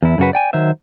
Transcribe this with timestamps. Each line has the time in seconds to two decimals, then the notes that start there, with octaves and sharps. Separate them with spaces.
0.02 E2 E4
0.18 F#2 C#3 F#4 B4
0.33 D5 G5 G#5
0.53 D#3 F#3 C5 E5